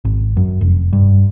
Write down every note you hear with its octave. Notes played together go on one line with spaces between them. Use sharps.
G#1
F#2
F1
G2